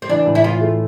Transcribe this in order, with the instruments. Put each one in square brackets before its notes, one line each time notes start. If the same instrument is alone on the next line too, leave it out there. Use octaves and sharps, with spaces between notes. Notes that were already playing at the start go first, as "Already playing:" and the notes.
[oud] C4
[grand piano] E3 [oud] D4
[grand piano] A2
[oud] E4
[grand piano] A2 [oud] F4
[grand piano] A3